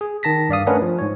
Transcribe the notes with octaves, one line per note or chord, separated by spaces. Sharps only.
G#4
D#3 A5 A#6 B6
G2 D5 F5 D#6
A3 C#4 D4 A#4 B4 F#5
F3
G#2 C#5